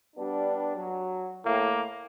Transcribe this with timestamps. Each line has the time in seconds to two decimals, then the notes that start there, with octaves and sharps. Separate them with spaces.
0.16 G3 B3 D4
0.76 F#3
1.45 A2 A#3